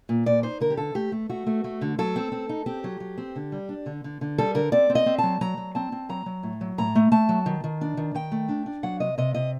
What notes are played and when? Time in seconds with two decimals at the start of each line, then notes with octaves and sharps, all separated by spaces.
0.09 A#2
0.26 A#2 D5
0.43 D#4 C5
0.61 D3 A#4
0.70 G4
0.77 D3 A4
0.95 A3 G4
1.12 A3
1.30 A3 F#4
1.47 A3
1.64 A3
1.81 D3
1.98 F#3 A4
2.16 C4
2.32 C4
2.49 D#4
2.66 C4 G4
2.84 F#3
3.00 F#3
3.18 C4
3.36 D3
3.52 G3
3.69 D4
3.86 D3
4.04 D3
4.21 D3
4.38 G3 A4
4.55 D3 A#4
4.72 C4 D5
4.90 C4
4.95 D#5
5.06 C4
5.18 F#3 A5
5.41 F#3 A#5
5.57 F#3
5.75 C4 A5
5.92 C4
6.09 F#3 A#5
6.26 F#3
6.43 A2
6.61 F#3
6.78 A2 A#5
6.95 A3
7.12 A3 A5
7.29 F#3
7.46 D#3
7.64 D#3
7.81 D4
7.97 D#3
8.14 D#3 G5
8.32 A3
8.49 D4
8.66 D4
8.83 F#3 F#5
9.00 C3 D#5
9.18 C3 D#5
9.34 C3 D#5